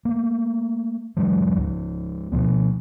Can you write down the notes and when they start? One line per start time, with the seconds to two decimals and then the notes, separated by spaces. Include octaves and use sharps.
0.05 A3 A#3
1.17 G2 E3 F#3 G#3
1.58 C#2 F3
2.32 B2 F3 B3